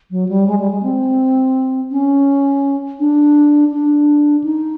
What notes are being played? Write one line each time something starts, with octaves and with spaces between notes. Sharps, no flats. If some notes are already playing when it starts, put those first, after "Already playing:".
F#3
G3
G#3
G3
G#3
C4
C#4
D4
D4
D#4